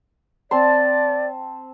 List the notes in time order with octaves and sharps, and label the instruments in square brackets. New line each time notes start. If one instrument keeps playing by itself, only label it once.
[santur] C4 A5 C6 [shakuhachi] D5